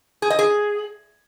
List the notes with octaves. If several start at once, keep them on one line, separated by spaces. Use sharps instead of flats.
G#4
D#5
G#4